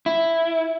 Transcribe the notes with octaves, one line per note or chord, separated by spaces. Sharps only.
E4